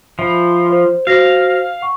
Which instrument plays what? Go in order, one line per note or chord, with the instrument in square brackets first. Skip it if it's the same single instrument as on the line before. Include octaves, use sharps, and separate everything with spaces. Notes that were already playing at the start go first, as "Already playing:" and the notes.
[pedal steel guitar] F3 [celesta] E5 B5
[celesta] C5
[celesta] F#4 C5 A#6 [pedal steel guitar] F5
[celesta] F#5 C#6